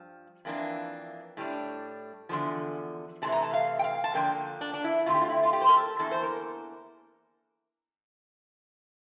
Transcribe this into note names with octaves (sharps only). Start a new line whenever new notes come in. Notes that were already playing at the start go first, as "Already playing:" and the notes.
Already playing: G2 F3
F2 E3 A#3 D4
A2 G3 D4
E2 D3 F3
C3 E3 A3 D4 A5
A#5
A5
F5
G5
F5
A5
D3 F3 A#3 D4 G5
D4
D4
E4
D3 A3 C4 F4
G4
F4
E4
F4
G4
C5
A#4
A4
E2 E3 A#3 D4 A4
C5
A#4